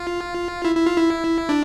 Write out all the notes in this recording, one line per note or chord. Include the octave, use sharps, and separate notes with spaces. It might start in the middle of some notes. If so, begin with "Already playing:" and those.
Already playing: F4
E4
E4
F4
E4
D4